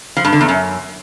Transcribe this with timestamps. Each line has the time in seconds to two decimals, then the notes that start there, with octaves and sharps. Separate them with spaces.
0.17 F3
0.25 G2
0.33 D3
0.41 E2
0.49 F#2